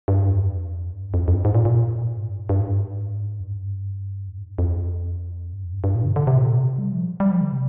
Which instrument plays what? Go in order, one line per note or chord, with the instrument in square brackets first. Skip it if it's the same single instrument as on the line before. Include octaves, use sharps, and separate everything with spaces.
[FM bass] G2
F2
G2
F2
F2
G2
G#2
A#2
A#2
G#2
G2
G2
G#2
F2
G2
F2
G#2
G2
F2
G2
F2
G2
G2
A#2
D3
D3
C3
A#2
C3
G3
F3
G3
F3
D3
C3